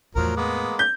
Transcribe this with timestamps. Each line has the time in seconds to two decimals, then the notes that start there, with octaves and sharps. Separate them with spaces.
0.15 E2 A2 F3 F#3 A#4
0.36 G#3 A#3 B3
0.79 G6